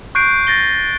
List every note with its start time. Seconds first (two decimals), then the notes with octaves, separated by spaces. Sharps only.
0.15 C#6 F#6 G6 C7 D7
0.47 A6 A#6 G7